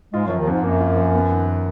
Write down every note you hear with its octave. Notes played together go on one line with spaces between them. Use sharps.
G#2 G#3 F4
F#2 F3 F#3
D#2 D#3
F2 G#2
F#2 A#3
F4
F3
B3
D#3